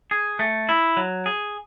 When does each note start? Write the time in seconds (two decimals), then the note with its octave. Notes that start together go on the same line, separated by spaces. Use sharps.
0.11 G#4
0.39 A3
0.69 E4
0.97 F#3
1.26 G#4